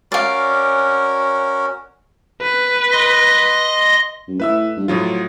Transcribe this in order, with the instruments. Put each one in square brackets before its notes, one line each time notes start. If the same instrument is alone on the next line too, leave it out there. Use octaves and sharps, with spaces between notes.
[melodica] C#4 F#4 A#4 [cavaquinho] D5 F5
[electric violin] B4
[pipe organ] D#5 C6 A#6
[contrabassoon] F#2
[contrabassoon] A2 [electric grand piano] B4 E5 E6
[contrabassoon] G2
[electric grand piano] A2 F#3 F4 [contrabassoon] F3